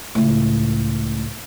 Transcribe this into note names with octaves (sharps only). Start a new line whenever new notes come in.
C#2 A2